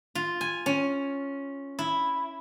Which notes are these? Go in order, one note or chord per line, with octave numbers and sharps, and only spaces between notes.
F4
G#5
C#4
E4